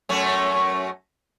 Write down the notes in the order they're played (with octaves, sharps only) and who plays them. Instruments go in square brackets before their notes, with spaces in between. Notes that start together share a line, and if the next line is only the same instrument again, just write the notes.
[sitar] F#2 A3 C#4